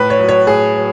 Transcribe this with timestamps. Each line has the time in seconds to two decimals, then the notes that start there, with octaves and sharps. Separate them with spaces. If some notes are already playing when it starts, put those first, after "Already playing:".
Already playing: A2 B4
0.10 C#5
0.19 F#3
0.29 C#5
0.47 A2 G#4
0.75 F#3